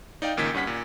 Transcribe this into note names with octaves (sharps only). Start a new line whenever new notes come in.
D#4 D5 F5 G5
C#2 A#2 D#3 C#4 G#6 B6
G2 C#4 F#5 B6
A#2